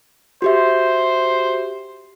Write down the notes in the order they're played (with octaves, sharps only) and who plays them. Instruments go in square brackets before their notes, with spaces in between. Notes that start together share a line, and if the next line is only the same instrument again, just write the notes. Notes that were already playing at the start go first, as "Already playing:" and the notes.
[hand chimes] F#4 G4 E5 [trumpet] C5